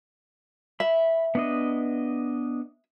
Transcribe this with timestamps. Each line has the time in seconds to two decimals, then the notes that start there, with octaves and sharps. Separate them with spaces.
0.80 E5 B5
1.35 B3 D4 D#5